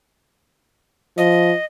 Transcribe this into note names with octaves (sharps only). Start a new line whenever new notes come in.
F3 D#5